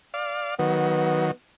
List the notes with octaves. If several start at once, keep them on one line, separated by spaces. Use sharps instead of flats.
D5 F5
D#3 F#3 B3